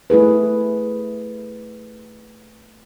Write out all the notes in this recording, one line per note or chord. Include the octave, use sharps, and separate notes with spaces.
A3 E4 G#4 B4